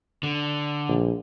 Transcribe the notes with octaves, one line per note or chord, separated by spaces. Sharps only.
D3
A#1